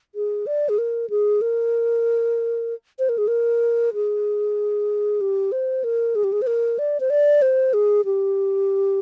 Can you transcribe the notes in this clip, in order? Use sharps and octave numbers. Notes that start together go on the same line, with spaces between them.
G#4
D5
G#4
A#4
G#4
A#4
C5
A#4
G#4
A#4
G#4
G4
C5
A#4
G#4
G4
G#4
C5
A#4
D5
C5
D5
C5
G#4
G4